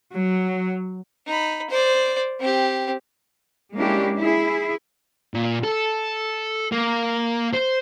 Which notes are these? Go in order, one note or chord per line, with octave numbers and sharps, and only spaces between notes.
F#3
D#4 B5
C5 D5
C4 G4
G#3 A#3 C#4 D4 E4 G4
E4 G#4
A#2
A4
A#3
C5